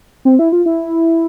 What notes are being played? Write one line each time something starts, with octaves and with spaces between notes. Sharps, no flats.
C4
E4
F4
E4